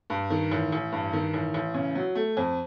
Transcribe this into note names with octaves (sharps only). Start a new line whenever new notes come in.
G2
D#3
A1
A1
G2
D#3
A1
A1
C#3
F#3
A3
F2